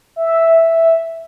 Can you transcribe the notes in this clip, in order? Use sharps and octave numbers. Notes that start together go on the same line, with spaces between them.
E5